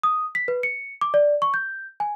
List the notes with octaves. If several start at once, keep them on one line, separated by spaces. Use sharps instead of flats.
D#6
B6
B4
C#7
D6
D5
C#6
G6
G#5